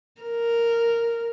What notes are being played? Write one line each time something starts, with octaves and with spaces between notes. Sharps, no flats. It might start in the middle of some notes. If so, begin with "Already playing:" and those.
A#4